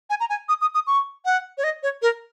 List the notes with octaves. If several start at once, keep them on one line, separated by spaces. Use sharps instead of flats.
G#5
A#5
G#5
D#6
D#6
D#6
C#6
F#5
C#5
D#5
C#5
A#4